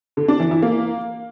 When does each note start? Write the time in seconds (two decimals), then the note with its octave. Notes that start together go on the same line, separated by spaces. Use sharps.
0.17 D3
0.28 D4
0.40 E3
0.51 E4
0.62 A#3